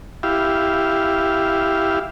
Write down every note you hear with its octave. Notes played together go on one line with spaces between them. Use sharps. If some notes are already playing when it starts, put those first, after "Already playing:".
E4 G4 F5